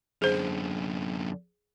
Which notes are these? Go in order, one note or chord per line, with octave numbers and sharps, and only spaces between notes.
F#2 D3 G#4 C5